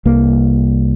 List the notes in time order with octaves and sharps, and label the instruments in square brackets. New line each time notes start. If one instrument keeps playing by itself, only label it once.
[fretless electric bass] C2 A#3